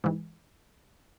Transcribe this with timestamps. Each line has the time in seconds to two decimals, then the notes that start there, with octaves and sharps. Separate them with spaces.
0.04 G#2 E3